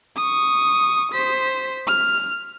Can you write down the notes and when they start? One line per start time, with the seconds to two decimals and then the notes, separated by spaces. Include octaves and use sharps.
0.16 C#6 D#6
1.12 C5 B6
1.87 F6